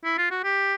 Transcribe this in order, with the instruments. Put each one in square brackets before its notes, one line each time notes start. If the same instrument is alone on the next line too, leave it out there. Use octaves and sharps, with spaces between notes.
[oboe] E4
F4
F#4
G4